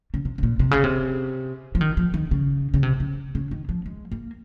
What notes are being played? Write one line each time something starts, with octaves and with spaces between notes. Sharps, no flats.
C#3
C3
C3
A#2
C3
C#3
C3
F3
D#3
F3
D#3
C#3
C#3
C3
C#3
C#3
D#3
F3
G#3
A#3